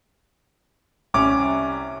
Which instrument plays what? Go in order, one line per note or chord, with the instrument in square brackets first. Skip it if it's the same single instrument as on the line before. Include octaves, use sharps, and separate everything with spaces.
[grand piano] C2 C#4 D6